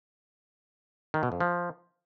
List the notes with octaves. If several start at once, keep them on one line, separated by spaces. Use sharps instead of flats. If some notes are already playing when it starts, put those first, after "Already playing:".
D#3
B2
F2
F3